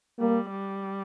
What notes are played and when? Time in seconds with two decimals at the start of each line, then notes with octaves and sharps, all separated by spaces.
0.19 G3 A#3
0.51 G3